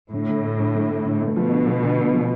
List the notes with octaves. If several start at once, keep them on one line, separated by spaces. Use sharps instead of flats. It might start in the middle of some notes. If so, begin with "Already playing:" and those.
A2 D3
D2
A3
D3
D3
A3
D3
A3
B2 F3
D3
F3
D2
D2
F3